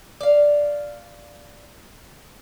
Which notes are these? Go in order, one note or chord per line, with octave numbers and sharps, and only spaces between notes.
D5 F5